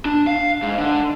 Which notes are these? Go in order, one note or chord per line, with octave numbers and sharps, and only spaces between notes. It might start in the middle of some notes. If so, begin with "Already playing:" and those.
D4
F5
G#2
D3